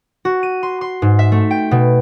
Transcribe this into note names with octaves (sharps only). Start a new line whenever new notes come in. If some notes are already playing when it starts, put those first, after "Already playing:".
F#4
D#7
C6
C6
G#2
E5
A3
G5
B2